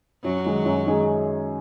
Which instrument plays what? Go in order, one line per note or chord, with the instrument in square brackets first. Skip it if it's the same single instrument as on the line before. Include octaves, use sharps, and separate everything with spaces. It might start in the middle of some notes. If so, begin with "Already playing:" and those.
[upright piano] F#2 [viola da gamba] F#3
[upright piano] D#3 G#3 D#4 G#4
F#2
D#3 G#3 D#4 G#4